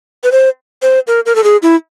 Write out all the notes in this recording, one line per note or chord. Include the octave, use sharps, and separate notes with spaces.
B4
C5
C5
A#4
A#4
A4
G#4
E4